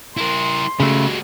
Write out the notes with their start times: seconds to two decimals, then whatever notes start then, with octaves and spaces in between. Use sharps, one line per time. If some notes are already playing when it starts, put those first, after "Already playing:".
0.17 E4 A#4 C6
0.80 C#3 F#3 G#3 A3